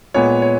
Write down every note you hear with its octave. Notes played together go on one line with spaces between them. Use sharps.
A#2 G#3 B3 C#5
C#5